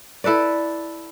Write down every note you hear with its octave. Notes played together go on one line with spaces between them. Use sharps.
E4 A4 B4 D5